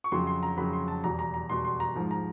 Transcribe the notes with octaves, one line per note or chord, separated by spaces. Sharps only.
C#6
F2 C#3 F#3 C6
C6
A#5
F2 C#3 F#3 B5
C6
A5
E2 B2 G3 A#5
A#5
A#5
E2 B2 G3 C6
C6
A#5
G#2 F3
A#5